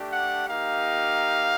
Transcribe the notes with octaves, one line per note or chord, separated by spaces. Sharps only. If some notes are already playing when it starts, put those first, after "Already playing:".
Already playing: A3 D4 G4
F#5
A#3 D#4 G4 F5